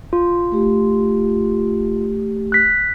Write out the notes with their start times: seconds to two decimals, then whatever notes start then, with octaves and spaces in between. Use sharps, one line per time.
0.13 F4
0.52 A3 G4
2.52 F#6 B6